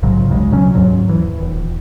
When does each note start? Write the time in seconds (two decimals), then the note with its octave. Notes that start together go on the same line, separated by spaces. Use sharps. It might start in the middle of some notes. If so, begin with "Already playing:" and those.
0.03 A#1 G#2 C#3 F#3
0.30 G1 D2 C#3 G#3
0.51 B2 F#3 C#4
0.75 D#2 G#2 F#3
1.09 E3
1.41 D#1